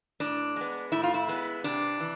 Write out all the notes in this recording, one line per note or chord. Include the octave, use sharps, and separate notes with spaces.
A2 D4
G#3 B3
A2 E4
F4
E4
G#3 B3
C3 D4
E3